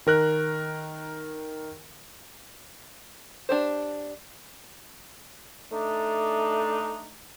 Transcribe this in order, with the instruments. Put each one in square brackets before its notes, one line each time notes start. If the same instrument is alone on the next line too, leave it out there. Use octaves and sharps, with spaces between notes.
[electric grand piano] D#3 A#4 F#6
[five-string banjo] D4 G4 C5
[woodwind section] A3 D4 D#4